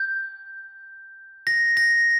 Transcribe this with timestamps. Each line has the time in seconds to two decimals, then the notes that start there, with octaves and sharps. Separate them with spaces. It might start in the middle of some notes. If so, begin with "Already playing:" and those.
Already playing: G6
1.47 A#6
1.77 A#6